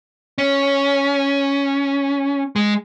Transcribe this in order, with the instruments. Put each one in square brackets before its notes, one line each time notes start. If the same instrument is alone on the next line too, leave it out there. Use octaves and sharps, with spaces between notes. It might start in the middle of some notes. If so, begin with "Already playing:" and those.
[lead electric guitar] C#4
G#3